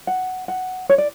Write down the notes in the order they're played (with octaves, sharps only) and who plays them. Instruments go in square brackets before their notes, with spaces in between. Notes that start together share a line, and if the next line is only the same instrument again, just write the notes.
[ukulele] F#5
F#5
C#5
D5